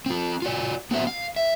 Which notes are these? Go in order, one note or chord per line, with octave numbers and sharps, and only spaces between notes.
C4 F4
F4 F#4 D5
B3 C4 F#4 E5
F5
E5